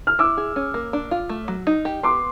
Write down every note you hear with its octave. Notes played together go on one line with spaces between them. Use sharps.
F6
E4 D6 E6
G#4
C#4
A#3
D4
F4
A3
F#3
D#4
G4
B3 C6 D6